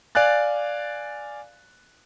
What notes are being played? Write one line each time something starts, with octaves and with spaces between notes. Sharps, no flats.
D5 F5 G#5 F#6 A6